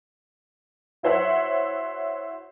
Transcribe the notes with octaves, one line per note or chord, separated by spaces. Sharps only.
E4 F#4 C5 C#5 E5 F#5